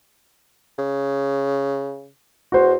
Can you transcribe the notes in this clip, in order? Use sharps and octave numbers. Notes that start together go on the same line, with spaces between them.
C#3
E2 F#4 C5